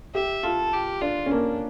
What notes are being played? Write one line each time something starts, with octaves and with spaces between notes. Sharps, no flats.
G4 E5
F4 A4
G4
D4 F4
C#4
A#3 D4